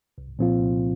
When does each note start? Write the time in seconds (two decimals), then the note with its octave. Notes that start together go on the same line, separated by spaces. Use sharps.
0.18 C2
0.39 A#2 F3 C4 F4
0.60 C2